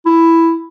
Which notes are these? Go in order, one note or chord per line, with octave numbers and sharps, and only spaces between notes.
E4